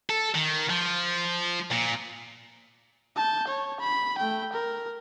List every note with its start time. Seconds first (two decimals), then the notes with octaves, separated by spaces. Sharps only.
0.10 A4
0.34 D#3
0.70 F3
1.71 A#2
3.16 A5 G6
3.48 C#5
3.81 B5
4.18 A3 G5
4.53 A#4